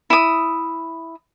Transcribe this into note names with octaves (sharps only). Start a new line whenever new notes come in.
E4 D#6